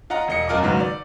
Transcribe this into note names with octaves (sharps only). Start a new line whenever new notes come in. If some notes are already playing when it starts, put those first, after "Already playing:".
F4 D#5 F#5 A#5
E1 D#5 C#7
F#2 F4 A#4 D#5 D6
C#2 G#2 D#3 F#3 B3
D5